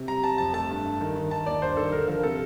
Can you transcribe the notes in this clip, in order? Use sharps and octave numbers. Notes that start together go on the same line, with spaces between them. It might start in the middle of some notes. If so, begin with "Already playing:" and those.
Already playing: C3
G3 A#5
G3 A5
F2 A5
A3 A5
G2
G2
D#3
D#3
D#3 A5
D#2 D5
G2 C5
D#3 A4
D3 A#4
F3 A#4
C3 A4